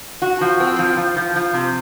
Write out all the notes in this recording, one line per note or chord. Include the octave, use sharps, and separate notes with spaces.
F#4
F3
C4
F3
F3
F3
F3
C3